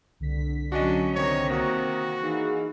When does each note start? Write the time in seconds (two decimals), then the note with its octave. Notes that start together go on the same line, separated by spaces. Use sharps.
0.20 C2 D3 B6
0.72 F#3 C#4 D4 F#4 D#5
1.15 C3 D#3 C#5
1.50 A#3 F#4 C#6 D#6
2.22 E3 D#4 G#4 F5